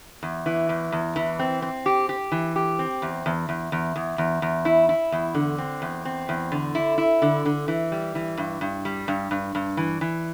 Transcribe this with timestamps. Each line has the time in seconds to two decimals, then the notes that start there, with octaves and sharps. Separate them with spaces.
0.23 E2
0.46 E3
0.69 E2
0.92 E2
1.16 E3
1.39 C4
1.62 C4
1.86 G4
2.09 G4
2.32 E3
2.56 G4
2.79 C4
3.02 E2
3.26 E2
3.49 E2
3.72 E2
3.96 E2
4.18 E2
4.42 E2
4.65 E4
4.89 E4
5.12 E2
5.35 D3
5.58 C4
5.82 E2
6.05 C4
6.29 E2
6.52 D3
6.75 E4
6.98 E4
7.22 D3
7.45 D3
7.68 E3
7.92 G3
8.15 E3
8.38 G2
8.61 G2
8.85 G3
9.08 G2
9.31 G2
9.55 G2
9.77 E3
10.01 E3